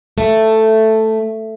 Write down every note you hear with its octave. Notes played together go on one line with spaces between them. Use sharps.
A3